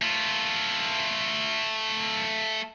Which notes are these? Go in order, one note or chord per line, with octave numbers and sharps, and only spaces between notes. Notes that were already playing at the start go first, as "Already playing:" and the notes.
A3 F4